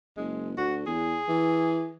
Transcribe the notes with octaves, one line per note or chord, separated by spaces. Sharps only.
F#1 G#3
D2 F#4
E2 G#4
E3